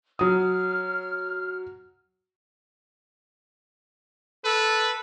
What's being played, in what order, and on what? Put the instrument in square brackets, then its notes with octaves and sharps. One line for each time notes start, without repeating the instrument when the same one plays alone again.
[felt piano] F#3 D#6 [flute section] F6
[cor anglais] A4 [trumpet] B4